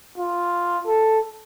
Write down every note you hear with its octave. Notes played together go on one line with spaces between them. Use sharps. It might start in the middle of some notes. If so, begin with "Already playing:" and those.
F4
A4